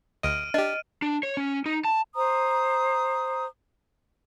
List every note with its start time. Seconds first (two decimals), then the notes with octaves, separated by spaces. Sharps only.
0.23 D2 D#5 F6 D7 D#7
0.54 D4 G4 D#5
1.02 D4
1.23 C#5
1.37 C#4
1.66 D#4
1.84 A5
2.15 C5 A#5 D#6